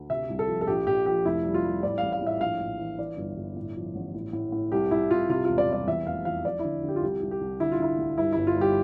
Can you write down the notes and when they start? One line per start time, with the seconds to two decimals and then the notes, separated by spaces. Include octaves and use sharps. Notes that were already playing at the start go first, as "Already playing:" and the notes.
Already playing: D2
0.10 C3 E5
0.29 C2
0.39 A4
0.48 F3
0.61 A4
0.67 A#1 G4
0.87 A#1 G4
1.06 F3 G4
1.25 F1 E4
1.44 G3
1.54 F4
1.64 G3
1.83 A2 D5
1.98 A1 F5
2.12 F5
2.21 A2
2.27 E5
2.41 A#1 F5
2.60 A#1
2.79 E3
2.98 E3 D5
3.17 G1
3.37 G1
3.56 A2
3.76 F3
3.95 A1
4.14 A2
4.33 A2
4.52 A2
4.72 C2 G4
4.91 C2 E4
5.11 C2 F4
5.30 C3 F4
5.45 E1 F4
5.58 D5
5.69 G3 D5
5.87 E2 E5
6.06 F1 F5
6.25 E2 F5
6.44 F3 D5
6.59 D3 E4
6.83 D3
6.88 G4
6.96 F4
7.02 C2 G4
7.22 C2
7.31 G4
7.41 C2
7.60 D3 E4
7.72 F4
7.79 D3 E4
7.98 D2
8.18 G2 E4
8.33 G1 E4
8.47 F4
8.56 G3
8.61 G4